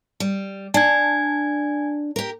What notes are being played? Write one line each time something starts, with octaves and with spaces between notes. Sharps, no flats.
G3
D4 G#5 A5 G#6
G4 A#4